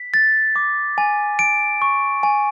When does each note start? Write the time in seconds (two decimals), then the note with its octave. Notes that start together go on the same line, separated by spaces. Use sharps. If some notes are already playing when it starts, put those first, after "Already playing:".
Already playing: B6
0.14 A6
0.56 D6
0.98 G#5
1.39 D7
1.82 C#6
2.23 G#5